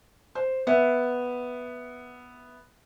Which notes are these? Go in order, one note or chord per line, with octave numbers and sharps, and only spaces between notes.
C5
B3 E5